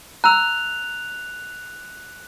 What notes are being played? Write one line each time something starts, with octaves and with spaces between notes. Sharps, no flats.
A#5 E6 F#6 F7